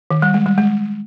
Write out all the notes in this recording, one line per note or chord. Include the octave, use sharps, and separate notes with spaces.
D#3
G3
G#3
G3
G#3